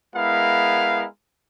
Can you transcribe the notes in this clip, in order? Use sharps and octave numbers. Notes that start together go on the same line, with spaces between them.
G#3 B3 E4 A#4 F5